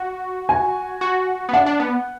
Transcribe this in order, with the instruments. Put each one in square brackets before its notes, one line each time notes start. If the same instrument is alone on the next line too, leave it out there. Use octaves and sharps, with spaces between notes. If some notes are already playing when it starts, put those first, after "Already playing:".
Already playing: [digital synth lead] F#4
[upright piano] G#5
[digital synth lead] F#4
B3
[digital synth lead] D4 [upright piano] F#5
[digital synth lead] D4
B3